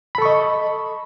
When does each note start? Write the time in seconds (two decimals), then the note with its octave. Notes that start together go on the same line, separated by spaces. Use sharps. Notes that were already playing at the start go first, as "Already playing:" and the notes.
0.15 B5
0.18 A4
0.22 C#6
0.25 D#5